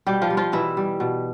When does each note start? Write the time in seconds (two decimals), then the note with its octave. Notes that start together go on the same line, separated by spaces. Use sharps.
0.07 B2 G3 G4
0.22 F3 F4
0.30 G3
0.37 F3 F4
0.52 B2 E3 E4
0.77 G3
1.00 B2